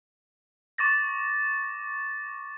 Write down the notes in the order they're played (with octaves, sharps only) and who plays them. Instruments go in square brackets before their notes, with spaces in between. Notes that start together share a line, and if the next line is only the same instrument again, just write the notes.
[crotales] C#6 D6 A6 A#6